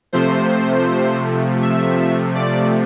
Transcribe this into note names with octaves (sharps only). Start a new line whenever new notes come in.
C3 F3 A3 C5
E5
D5